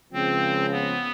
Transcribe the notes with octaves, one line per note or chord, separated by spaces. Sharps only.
C#2 C#3 F3 C4
B3